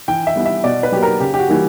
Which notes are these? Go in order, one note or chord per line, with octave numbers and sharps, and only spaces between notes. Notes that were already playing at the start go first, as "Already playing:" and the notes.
E3 G5
E5
G3 B3 E4
E5
B2 D5
B4
F#3 A#3 G4
A#4
C#3 G4
G4
F#4
E3 G3 A#3